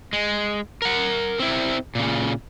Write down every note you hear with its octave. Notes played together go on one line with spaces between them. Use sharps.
G#3
A#4 F#5
C4 E4
A#2 C#3